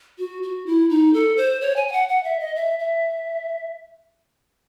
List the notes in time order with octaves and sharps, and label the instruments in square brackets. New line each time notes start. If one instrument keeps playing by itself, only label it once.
[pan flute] F#4
F#4
E4
D#4
A4
C5
C#5
G#5
G#5
F#5
F#5
E5
D#5
E5
E5